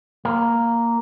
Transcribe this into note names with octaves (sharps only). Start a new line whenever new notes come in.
A#3